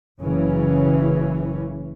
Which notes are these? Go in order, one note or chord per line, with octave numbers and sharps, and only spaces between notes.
F#1 C#3 E3 C#4